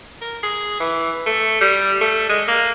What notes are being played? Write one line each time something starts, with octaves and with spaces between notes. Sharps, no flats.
A#4
G#4
E3
A3
G3
A3
G#3
A#3